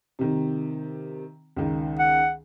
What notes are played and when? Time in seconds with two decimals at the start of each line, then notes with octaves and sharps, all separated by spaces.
0.19 C3 D#3
1.56 C#2 D#3
1.99 F#5